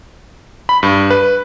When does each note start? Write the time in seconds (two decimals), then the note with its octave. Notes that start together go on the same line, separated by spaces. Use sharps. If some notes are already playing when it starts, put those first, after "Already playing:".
0.69 B5
0.83 G2
1.11 B4